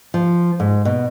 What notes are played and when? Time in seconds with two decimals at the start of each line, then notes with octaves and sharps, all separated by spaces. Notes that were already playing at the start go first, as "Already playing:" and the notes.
0.14 F3
0.60 G#2
0.85 B2